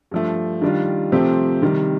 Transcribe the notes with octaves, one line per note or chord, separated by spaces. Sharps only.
G2 F3 A3
D#3 G3 D4 F4
C3 F3 A3 C4 G4
C3 D#3 G3